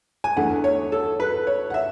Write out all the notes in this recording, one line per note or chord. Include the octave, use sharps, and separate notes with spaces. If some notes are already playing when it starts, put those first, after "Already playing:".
G#5
E2 D3 A3 F#5
C#5
A4
B4
C#5
F#5
E5